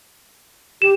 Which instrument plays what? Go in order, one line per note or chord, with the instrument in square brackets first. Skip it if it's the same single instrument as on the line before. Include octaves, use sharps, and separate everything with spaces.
[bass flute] G4 [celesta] E7